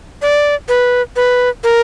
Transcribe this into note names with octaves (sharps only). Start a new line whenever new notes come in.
D5
B4
B4
A#4